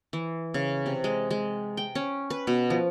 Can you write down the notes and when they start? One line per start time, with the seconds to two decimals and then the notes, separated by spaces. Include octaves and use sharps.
0.13 E3
0.54 C#3
0.86 C3
1.04 G#3
1.31 G#3
1.77 G5
1.95 C#4
2.30 B4
2.47 B2
2.70 F3